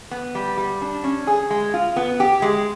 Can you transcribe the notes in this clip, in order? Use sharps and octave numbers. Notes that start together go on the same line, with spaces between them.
B3
G3
G3
D4
C#4
G#4
G#3
F4
B3
G4
G#3